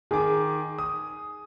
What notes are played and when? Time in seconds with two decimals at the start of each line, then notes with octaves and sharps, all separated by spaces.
0.11 D#3 G#4 D6
0.79 D#6